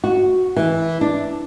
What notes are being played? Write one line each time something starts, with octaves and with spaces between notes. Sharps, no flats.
F#4
E3
D4